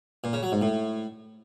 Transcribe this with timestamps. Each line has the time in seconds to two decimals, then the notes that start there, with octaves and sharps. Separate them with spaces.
0.24 A#2
0.33 C#3
0.43 F#3
0.52 G#2
0.61 A2